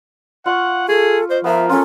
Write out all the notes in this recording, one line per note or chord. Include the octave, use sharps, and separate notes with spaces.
F4 F#5 C#6
G#4 A4
C5 D#5
F3 B3 A#4 E5
C#4 F4 A4